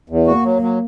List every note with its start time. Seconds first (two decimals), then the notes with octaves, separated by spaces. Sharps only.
0.10 E2
0.27 A#3 F#4
0.44 F#3
0.62 F#3